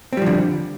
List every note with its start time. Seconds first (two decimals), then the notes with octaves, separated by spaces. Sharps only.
0.13 C4
0.17 G3
0.22 F3
0.26 D3